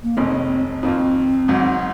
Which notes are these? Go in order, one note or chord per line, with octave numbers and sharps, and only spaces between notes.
A#3
F1 F2 D#3 G#3 C4 C#4
F2 D#3 A#3 C4 F4
G#1 G#2 F#3